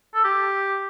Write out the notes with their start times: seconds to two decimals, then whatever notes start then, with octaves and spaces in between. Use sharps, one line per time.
0.14 A4
0.24 G4